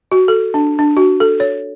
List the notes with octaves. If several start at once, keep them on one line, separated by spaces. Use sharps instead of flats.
F#4
A4
D4
D4
F#4
A4
C#5